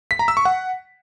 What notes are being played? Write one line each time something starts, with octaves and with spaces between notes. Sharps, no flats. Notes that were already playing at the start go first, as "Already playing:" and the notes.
B6
A#5
E6
C#6
F#5